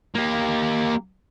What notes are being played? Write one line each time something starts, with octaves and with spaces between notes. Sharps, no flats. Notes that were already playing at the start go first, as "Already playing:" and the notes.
A#3 G4